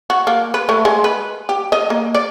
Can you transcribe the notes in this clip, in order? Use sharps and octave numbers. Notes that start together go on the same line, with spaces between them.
F#4
A#3
B4
A3
G#3
B4
G4
D#5
A#3
D5